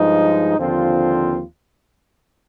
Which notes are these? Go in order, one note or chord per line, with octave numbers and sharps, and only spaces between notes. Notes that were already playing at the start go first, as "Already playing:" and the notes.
Already playing: G2 F3 G#3 D#4
D#2 D3 F3 C4 F4